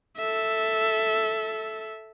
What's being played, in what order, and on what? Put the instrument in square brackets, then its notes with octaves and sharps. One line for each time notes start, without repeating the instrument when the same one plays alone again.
[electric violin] A4 E5